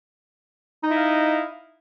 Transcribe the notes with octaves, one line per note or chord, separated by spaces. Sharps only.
D#4 E4 D#5 F5